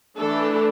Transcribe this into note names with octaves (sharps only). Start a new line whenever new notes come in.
E3 A3 D4 A4